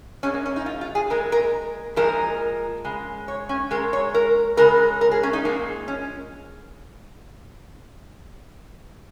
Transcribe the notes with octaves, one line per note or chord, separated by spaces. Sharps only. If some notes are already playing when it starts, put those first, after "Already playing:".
A#2 G#3 C#4
A#3
C#4
D#4
F4
F4
G#4
A#2 G#3 A#4
A#4
A#2 F3 G#3 A#4
C#3 G#3
C#5
C#4
A#2 G#3 A#4
C#5
A#4
C#3 G#3 A#4
A#4
G#4
C#4
D#4
A#2 F3 G#3 A#3
C#4